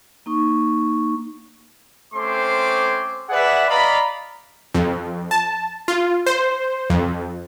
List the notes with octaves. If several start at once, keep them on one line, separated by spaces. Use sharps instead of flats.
A#3 D#4 C#6
A3 C4 C#4 C5 C6 D6
G#4 B4 D5 E5 F#5
D5 D#5 F5 A#5 B5
F2
A5
F4
C5
F2